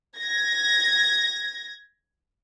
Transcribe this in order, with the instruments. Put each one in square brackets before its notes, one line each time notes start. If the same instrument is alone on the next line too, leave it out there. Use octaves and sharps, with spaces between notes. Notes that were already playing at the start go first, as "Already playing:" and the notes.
[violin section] G#6 A#6